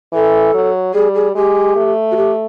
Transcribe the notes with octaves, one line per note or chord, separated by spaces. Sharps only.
E3 A4
F#3
G3 G#4
G#4
G#3 G4
A3
F#4
G4